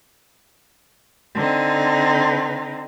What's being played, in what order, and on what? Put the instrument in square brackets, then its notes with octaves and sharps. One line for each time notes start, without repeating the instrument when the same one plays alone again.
[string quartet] D3 C4 D#4